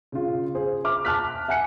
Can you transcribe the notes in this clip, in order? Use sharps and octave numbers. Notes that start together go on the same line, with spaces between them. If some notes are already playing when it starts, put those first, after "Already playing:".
C#3 F4
G#4 C5
E5 D6 F6
A5 D6 F6 F#6 B6
E5 F#5 G#5 F#6 C#7